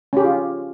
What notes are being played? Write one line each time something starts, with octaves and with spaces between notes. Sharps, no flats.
C#4 F4 G4 G#4